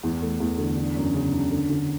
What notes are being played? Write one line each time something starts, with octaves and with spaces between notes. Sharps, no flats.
E2
A3
E2
D3
D4
F#2
C#3
D4
D3
D3